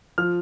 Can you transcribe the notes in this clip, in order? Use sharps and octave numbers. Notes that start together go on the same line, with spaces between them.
F3 F6